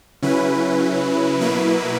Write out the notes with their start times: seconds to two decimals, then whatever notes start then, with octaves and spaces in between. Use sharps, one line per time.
0.22 C#3 F#3 C#4 E4 B4
1.41 B2 F#3 A#3 E4 B4